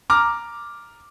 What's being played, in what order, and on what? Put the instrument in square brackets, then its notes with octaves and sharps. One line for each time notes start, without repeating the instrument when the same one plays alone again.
[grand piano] A#5 D6 F6